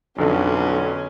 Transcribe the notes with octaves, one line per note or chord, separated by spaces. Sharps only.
B1 F2 D3 C#4